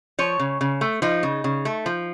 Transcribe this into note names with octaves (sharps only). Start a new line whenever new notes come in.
F3 C#5
C#3
C#3
A3
F3 D#4
C#3
C#3
A3
F3